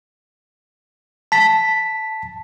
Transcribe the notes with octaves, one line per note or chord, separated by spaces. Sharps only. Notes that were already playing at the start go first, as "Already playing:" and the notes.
A5 B6